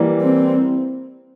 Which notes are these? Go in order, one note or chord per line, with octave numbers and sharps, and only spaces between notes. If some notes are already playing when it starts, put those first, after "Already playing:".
Already playing: E3 G3 A#3
C4